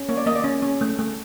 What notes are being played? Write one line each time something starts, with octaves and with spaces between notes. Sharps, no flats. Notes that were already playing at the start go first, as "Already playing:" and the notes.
Already playing: C#4
A#3 C#5
D5
A#3 D#5
D5
C#4
C#4
A3
A3